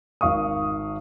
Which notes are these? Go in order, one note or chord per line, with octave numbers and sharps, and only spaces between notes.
G#1 F5 C#6 D#6